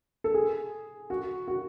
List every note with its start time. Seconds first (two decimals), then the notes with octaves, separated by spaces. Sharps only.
0.24 A4
0.34 G#4
1.10 F#4
1.48 F#4